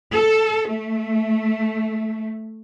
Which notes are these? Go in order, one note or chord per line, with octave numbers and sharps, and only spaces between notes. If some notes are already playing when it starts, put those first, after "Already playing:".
A4
A3